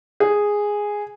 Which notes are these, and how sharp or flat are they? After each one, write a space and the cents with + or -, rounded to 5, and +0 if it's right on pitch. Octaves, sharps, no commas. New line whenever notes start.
G#4 -5